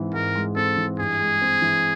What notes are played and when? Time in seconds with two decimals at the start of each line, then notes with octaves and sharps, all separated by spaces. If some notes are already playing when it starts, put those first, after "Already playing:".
Already playing: G#2 E3 G#3 C4
0.13 G#2 A#4
0.35 G#3
0.56 C4 A4
0.77 E3
0.99 G2 G#4
1.20 G#3
1.42 C4
1.62 E3